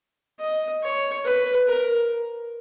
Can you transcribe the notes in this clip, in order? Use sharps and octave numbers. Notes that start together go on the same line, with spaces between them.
D#5
C#5
B4
A#4